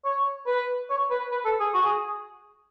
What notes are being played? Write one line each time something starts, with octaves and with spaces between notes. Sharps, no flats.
C#5
B4
C#5
B4
B4
A4
G#4
F#4
G#4